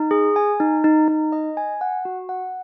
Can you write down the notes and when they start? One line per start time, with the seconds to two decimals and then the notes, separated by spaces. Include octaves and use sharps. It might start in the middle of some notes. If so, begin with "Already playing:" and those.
Already playing: D#4
0.11 G#4
0.36 G#5
0.60 D#4
0.84 D#4
1.08 D#4
1.32 D#5
1.57 G#5
1.81 F#5
2.05 F#4
2.29 F#5